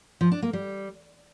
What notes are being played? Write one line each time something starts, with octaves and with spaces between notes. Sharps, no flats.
F3
D4
A#3
G3